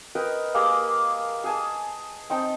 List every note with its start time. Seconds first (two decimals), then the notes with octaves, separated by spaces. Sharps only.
0.15 A#4 B4 D#5 G5
0.54 A#3 G4 G#4
1.44 G#4 G#5 A5
2.30 C4 D#4 G5 A5